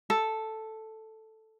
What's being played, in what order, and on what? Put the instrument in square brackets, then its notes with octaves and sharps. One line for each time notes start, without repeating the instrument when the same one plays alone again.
[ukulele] A4